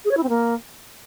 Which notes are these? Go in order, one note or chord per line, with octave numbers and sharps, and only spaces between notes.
G#4
C#5
E4
C4
A#3